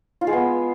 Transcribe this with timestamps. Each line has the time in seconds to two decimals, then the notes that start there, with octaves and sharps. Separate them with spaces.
0.21 F4
0.27 G#3
0.33 B3